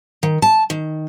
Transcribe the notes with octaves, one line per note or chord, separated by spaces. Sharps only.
D#3
A5
D#3